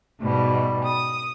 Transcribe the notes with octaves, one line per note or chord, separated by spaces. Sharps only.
G#2 B2 G3
D#6